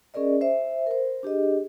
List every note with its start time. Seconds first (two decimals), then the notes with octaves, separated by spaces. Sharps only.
0.14 C#4 G#4 A#4 D5 D#5
0.41 C5 E5
0.87 A#4 C5
1.23 D4 G4 G#4 D#5